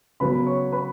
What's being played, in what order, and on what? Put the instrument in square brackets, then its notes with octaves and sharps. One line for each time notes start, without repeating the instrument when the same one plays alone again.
[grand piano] C#3 F#3 B3 B4 B5
C#5 C#6
B4 B5